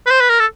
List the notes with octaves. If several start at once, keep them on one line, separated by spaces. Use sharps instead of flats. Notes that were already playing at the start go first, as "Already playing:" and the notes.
B4
C5
B4
A#4
A4